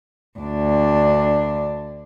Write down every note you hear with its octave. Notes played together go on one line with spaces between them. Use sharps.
D2 D4